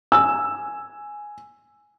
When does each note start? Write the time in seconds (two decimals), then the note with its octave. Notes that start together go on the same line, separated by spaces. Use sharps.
0.12 G#5 E6